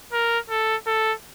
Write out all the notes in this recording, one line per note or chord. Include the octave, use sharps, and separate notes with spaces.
A#4
A4
A4